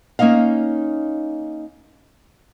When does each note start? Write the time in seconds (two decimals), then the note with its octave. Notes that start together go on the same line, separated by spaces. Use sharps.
0.19 A#3 C#4 D#4 D#5 F5